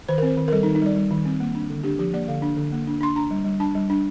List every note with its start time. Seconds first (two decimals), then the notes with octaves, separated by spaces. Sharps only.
0.09 D#3 C5
0.18 A#4
0.22 C4 C5
0.37 D#3
0.48 A#4
0.52 G3 A4
0.63 D#4
0.67 D#3
0.75 D#4
0.82 G3 D5
0.96 G3
1.11 D#3
1.25 C4
1.40 A#3
1.55 D4
1.70 D3
1.84 D4 G4
1.99 F3 G4
2.13 A#3 D5
2.28 D3 F5
2.42 D4
2.57 D3
2.72 A#3
2.87 D4
3.01 D4 C6
3.15 D4 A#5
3.31 G3
3.45 G3
3.60 D4 A5
3.75 G3
3.90 D4